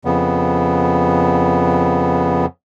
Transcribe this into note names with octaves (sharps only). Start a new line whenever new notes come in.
F2 C#3 B3